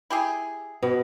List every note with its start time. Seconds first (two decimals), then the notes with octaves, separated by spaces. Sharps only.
0.10 E4 G4 G#4
0.82 B2